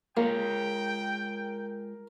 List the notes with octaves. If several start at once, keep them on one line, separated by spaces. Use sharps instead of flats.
G#3 A#3 F4 A#4 C#5 G5